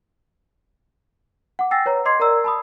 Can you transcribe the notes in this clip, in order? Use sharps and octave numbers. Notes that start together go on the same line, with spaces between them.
F#5 D6
G5 G#5 E6 A6 A#6 C7
B4 C#5 A#5
D#5 C6 D6 G#6 C7
A#4 D5 A#5 E6
A5 B5 D#6